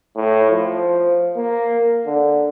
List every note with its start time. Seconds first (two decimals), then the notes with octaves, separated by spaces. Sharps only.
0.16 A2
0.50 F3
1.37 A#3
2.06 D3